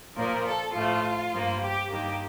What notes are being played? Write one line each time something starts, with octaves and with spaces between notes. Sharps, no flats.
A#2 F3 A#3 A#4
A4
A2 F3 A3 F4
G2 F3 A#3
G4
G2 D#3 A#3 G4